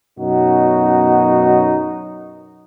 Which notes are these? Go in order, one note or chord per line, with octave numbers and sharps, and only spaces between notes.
F#2 B2 F#3 D#4 F#4